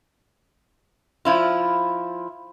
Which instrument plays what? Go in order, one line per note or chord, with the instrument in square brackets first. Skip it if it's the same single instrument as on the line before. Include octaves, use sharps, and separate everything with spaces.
[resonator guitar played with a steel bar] F3 E4 F4